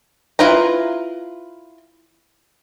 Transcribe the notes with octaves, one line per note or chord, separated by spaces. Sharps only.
E4 F4 B4 A#5